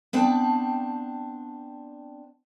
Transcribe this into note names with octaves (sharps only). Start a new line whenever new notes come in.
B3 C4 D4 G5 A5